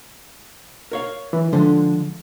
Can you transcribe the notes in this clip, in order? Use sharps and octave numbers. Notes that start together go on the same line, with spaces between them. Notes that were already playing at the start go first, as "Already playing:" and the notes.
A#4 C#5 F5
E3
D3 F3 G#3